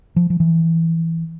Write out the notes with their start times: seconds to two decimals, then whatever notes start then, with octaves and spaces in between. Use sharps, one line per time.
0.16 F3
0.30 F3
0.40 E3